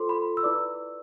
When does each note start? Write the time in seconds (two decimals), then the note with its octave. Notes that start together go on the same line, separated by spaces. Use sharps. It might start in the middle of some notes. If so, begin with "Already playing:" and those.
Already playing: F4 A4 C5 C6 D6
0.09 B5
0.37 E6
0.43 E4 B4 D5 D6